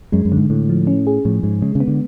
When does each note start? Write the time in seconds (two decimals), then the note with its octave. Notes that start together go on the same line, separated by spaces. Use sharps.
0.12 F#2 G#3
0.25 F#2
0.32 D3
0.37 G#2
0.50 A2 D3
0.69 F3
0.87 C#4
1.07 G#4
1.25 A2 F3
1.43 G#2 G#3
1.62 C#3 G#3
1.75 C#3
1.80 B3
1.87 D3